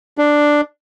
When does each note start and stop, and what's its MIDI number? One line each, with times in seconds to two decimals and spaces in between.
0.18 0.61 62